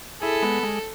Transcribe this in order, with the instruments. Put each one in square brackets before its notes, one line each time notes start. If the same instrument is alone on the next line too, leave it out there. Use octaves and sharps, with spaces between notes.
[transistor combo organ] E4 G#4 [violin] A4
[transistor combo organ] G#3 B3
G#3